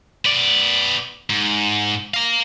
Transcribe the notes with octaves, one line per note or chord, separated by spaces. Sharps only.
B3 D5
G#2
F5 A#5